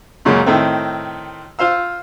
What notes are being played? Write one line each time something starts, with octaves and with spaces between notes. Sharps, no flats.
F#2 A#2 C#3 G#3 C#4
A2 D#3 A3 C4
F4 C5 F5 E6